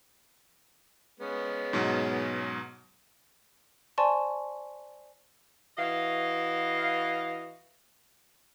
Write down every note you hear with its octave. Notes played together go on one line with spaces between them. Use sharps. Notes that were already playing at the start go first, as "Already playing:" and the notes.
G#3 B3 C#4
G#2 B2 F#3
C5 D5 G#5 A5 C6 C#6
E3 F#4 D#5 F5